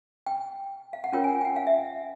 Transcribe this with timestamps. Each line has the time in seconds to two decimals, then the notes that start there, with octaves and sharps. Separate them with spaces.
0.26 G5
0.93 F5
1.04 F#5
1.13 C#4 F4 A#4 C#5 G5
1.24 G#5
1.41 G5
1.45 F#5
1.56 F5
1.67 E5